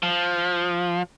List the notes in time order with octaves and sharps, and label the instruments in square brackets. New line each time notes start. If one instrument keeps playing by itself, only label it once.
[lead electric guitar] F3